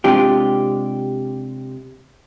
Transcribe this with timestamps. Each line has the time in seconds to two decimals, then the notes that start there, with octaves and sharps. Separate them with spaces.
0.04 C3 G#3 D4 F4 G4